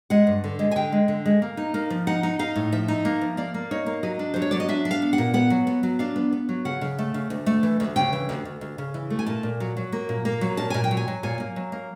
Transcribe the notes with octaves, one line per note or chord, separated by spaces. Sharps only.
G#3 F#5
G2
D3
G#3
G#5
D3 G5
G#3
D3
G#3
A#3
D#4
A#3
F3
D#4 F#5
D#4
D#4 F5
A2
F3 E5
D#4
A#3
F3
A#3 D5
A#3
D#4 C#5
A#3
F#3 D#5
D4
F#3 C5
C#5
F#3 D5
D#5
D4 E5
D4
F5
B3
F#5
A#2
B3 F#5
F#3
B3
F#3
D4 F5
B3
B3
F#3
C#3 F#5
C#3
A3
C#3
D2
A3
E3
D2
C#3 G5
E3
D2
D2
D2
C#3
E3
A3
G#5
A#2 A5
A#2
F#3
F#3
A#3
A#2
A#3
F#3
A#2 A5
A#2 G#5
G5
F#3
G#5
F#3
A#2 G#5
A#3
F#3
A#3